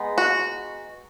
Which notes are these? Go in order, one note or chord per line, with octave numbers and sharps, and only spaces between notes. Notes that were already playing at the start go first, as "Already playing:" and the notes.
Already playing: G#3 B3 D#4
F#4